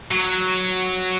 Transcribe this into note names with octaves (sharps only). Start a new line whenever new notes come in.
F#3